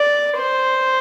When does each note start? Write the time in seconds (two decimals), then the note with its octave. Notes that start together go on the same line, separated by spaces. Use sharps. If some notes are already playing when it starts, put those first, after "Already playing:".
Already playing: D5
0.38 C5